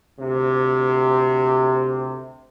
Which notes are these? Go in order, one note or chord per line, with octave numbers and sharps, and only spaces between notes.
D2 C3